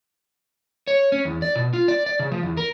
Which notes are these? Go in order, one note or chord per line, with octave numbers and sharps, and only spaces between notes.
C#5
C#4
E2
D5
B2
F4
D5
D5
C#3
F3
E2
A#4